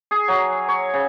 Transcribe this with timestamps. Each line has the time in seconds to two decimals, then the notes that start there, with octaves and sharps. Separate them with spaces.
0.11 G#4
0.28 F#3
0.69 C#5
0.94 C#3